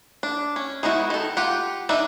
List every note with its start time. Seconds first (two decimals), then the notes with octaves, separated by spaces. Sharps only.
0.23 D4
0.56 C#4
0.83 G#3 B3 D#4 E4 F#4
1.10 D#3 A4
1.37 F4 G4 F#5
1.89 D4 D#4 B4 D5 E5